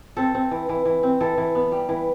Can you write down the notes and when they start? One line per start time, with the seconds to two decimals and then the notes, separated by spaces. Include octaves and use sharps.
0.17 C4 A4
0.35 C4
0.51 E3
0.69 E3
0.85 E3
1.03 C4
1.20 E3 A4
1.38 E3
1.55 B3
1.72 G3
1.89 E3